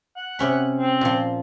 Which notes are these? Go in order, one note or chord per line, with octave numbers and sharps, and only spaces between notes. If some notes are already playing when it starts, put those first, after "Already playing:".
F#5
C3 C#4 B5
C4
A#2 F3